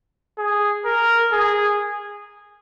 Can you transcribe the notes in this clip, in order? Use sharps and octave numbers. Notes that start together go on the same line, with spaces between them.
G#4
A#4
G#4